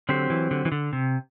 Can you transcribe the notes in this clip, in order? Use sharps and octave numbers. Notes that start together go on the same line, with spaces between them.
D3 F#3 C4 G4 C5
E3
D3
E3
D3
C3